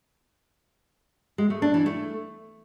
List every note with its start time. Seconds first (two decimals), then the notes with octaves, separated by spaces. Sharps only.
1.38 G#3
1.50 A3
1.62 D4
1.74 E3
1.86 A3